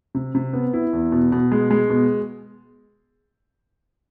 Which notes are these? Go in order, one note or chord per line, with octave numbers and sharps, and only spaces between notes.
C3
C3
B3
E4
E2
B2
B2
G#3
G#3
B2